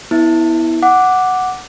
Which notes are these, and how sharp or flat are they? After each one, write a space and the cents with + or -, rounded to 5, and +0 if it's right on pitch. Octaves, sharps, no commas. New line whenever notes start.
B3 +0 E4 -15
F#5 +0 D6 +0